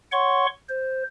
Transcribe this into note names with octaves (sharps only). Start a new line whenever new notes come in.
C#5 F#5 C6 C#6
C5